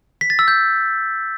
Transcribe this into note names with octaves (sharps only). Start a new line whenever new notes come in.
B6
A6
E6
G6